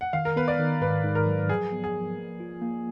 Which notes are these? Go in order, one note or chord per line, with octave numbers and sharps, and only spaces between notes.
F#5
D#3 F5
A#4
B3 B4
D5
D#3
G#2 B4
G#2
A#4
F#3
F3 G#4
B3
G#4
F3
A#3
F4
A#3